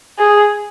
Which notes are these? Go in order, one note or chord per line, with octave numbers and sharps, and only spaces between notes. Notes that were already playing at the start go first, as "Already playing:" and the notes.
G#4